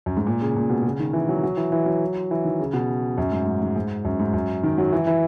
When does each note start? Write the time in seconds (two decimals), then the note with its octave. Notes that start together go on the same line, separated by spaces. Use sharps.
0.06 F#2
0.17 G#2
0.27 A#2
0.41 C#3
0.56 A#2
0.70 B2
0.84 C#3
0.99 D#3
1.13 E3
1.29 F#3
1.43 F#3
1.57 E3
1.72 E3
1.86 F#3
2.31 E3
2.45 D#3
2.60 C#3
2.73 B2
3.18 F#2
3.32 G#2
3.46 G#2
3.62 G#2
3.76 G#2
4.05 F#2
4.20 G#2
4.33 F#2
4.63 D#3
4.78 F#3
4.92 E3
5.07 E3